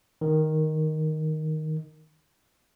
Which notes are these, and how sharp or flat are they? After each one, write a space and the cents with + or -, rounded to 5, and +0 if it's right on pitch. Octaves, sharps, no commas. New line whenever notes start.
D#3 +0